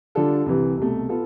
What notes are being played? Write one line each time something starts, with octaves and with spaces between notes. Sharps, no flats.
D3 G3 D4 F4 A4
C2 C3 E3
C2 B2 A3
B3 F4 A4